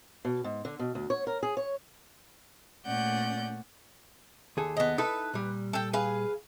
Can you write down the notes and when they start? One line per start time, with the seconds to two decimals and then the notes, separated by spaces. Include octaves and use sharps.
0.25 B2
0.44 G#2
0.65 D3
0.79 B2
0.95 D2
1.10 C#5
1.27 A#4
1.43 G#4
1.57 C#5
2.86 A#2 A3 C#4 D5 F#5 G6
4.57 D#2 G#4 A4
4.77 B3 D#5
4.98 D#4 E4 A4 B4
5.34 A#2 G3
5.73 A4 G5
5.93 G#4 B4 F5